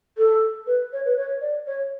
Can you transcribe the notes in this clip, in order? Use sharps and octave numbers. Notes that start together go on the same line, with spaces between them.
A4
B4
C#5
B4
C#5
D5
C#5